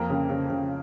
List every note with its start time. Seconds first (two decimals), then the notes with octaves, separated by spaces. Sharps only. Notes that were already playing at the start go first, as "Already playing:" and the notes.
Already playing: F2 A#3 A#4
0.10 C#3
0.30 C#3
0.50 C#3